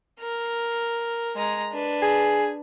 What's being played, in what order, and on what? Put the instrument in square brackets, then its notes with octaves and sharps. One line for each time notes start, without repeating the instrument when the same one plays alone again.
[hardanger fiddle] A#4
G#3 A#5
D4 B4
[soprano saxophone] G#4